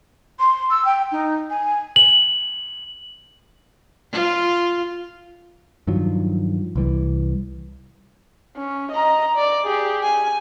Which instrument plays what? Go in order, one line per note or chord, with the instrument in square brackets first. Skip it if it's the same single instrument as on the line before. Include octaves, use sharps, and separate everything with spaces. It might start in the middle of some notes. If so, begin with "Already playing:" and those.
[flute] C6
E6
G5
D#4
G#5
[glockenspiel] F#7
[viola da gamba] F4
[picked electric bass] G2 D#3 F3 F#3
C2 E3 G3
[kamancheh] C#4
D#5 A#5
D5
G4 G#4
G#5